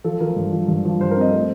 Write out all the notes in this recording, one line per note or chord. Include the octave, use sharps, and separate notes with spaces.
F3 A4
F3 A#4
G2
F3
G2
F3
G2 C5
A#4
C4 D#5
A3 C5